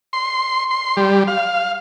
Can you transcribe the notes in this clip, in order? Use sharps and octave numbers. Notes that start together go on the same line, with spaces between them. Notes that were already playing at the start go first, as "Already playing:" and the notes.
C6
C6
G3
F5